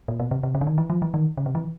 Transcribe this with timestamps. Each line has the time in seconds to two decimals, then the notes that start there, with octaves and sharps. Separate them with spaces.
0.08 A#2
0.20 B2
0.31 C3
0.43 C3
0.55 C#3
0.61 D3
0.67 D#3
0.78 E3
0.90 F3
1.02 E3
1.14 D#3
1.37 C#3
1.46 C3
1.55 E3